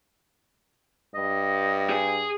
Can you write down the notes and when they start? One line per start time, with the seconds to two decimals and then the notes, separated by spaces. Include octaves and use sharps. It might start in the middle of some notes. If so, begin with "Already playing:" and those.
1.15 G2 D#5
1.90 G#4